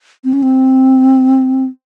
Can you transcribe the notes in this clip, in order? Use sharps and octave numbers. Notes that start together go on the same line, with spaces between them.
C4
C#4
C4